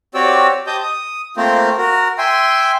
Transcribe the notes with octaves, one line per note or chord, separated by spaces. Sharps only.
C4 F#4 G4 C#5 D5 E6
G4 C5 D#5 A5 D#6 G6
D#6
A3 A#3 C4 F4 A#4 C5
F#4 A#4
E5 G5 G#5 C6